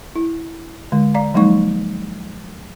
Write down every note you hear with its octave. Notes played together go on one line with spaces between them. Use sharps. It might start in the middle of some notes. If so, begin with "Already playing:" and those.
E4
D3 G#3
D5 F5 A#5
F3 F#3 G#3 A#3 D#4 C#6